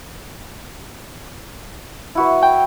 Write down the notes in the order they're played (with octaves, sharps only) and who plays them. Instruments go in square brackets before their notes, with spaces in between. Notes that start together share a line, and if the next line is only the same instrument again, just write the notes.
[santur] E4 F#4 B4
[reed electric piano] G5